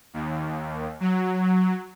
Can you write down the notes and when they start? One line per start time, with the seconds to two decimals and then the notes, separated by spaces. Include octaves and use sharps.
0.14 D#2
1.00 F#3